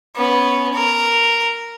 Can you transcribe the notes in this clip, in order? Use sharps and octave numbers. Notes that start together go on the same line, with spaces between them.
B3 C#4
A#4